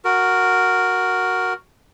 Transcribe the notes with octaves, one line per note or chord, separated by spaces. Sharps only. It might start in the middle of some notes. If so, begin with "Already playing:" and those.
F#4 A#4